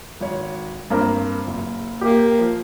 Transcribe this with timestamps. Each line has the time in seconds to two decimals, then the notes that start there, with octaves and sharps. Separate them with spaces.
0.21 G#1 C#5
0.90 G2 A#3 C4
1.47 F#1
2.01 A#3 G4
2.39 F3